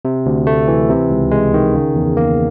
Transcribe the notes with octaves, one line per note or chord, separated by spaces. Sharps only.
C3
D2
A3
E3
C3
C#2
G#3
D#3
C#3
E2
A#3